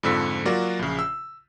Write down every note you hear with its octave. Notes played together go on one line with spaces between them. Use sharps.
F2 G#2 D3 F3 E6 B6
F#3 A#3 F4 F#4 A#4 D5
A#1 C#3
E6